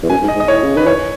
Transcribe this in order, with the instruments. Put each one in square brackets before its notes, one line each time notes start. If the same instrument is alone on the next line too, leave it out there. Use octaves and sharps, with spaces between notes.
[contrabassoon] E2
[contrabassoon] F#2 [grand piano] G#5
[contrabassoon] G#2
[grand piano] D#5
[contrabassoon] G#2
[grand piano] D#5
[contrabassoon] A2 [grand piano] C#5
[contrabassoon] C#3
[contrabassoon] D#3 [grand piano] B4
[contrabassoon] E3 [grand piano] C#5